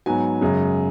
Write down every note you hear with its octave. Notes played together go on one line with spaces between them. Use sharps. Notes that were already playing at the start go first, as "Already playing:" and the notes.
G#2 F#3 B3 G#5
F#2 C#3 G#3